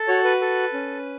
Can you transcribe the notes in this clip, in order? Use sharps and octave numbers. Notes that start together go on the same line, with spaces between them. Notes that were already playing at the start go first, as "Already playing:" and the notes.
Already playing: A4
F#4 C#5
B4
A4
C#4